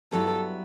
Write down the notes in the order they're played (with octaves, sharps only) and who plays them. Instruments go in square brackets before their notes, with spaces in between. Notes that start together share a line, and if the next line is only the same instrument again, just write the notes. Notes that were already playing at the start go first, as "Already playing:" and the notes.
[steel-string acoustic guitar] G2 F#3 B3 E4 [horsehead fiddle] A4